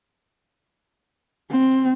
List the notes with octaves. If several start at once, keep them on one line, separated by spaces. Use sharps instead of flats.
C4